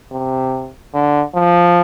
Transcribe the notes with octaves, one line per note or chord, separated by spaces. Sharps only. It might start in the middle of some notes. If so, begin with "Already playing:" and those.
C3
D3
F3